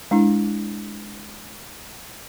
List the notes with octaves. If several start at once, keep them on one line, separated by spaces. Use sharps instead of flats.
G#3 D4 E4